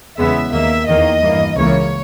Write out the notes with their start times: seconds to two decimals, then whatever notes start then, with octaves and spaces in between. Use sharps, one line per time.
0.18 E2 C#3 G#3 B3 E5
0.52 D#2 D#3 A#3 E5
0.87 E2 D#3 A#3 D#5
1.22 G2 E3 A#3
1.56 C#2 C#3 E3 A#3 C#5